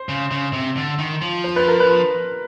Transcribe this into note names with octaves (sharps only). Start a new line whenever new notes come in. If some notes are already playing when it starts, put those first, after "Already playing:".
Already playing: C5
C#3
C#3
C3
D3
D#3
F3
C5
B4
A#4
B4